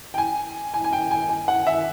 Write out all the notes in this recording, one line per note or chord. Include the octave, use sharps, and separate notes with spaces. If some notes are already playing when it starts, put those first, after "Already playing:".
G5
G#5
G#5
G#5
G5
G#5
G#5
F#5
E5